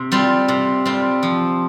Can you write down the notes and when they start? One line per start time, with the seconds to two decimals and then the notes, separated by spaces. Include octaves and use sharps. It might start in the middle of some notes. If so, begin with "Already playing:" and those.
Already playing: C3
0.12 G3 C4 F4
0.48 C3
0.85 G3 C4 F4
1.23 F3